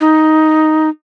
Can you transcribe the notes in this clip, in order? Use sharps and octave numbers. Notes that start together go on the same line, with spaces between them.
D#4